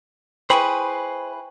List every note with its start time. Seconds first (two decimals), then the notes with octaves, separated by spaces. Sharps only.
0.50 E4 G#4 B4 C5 G5 G#5 B5 C#6